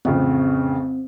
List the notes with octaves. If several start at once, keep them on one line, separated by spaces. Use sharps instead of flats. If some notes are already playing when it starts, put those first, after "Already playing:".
A1 F2 C#3 C4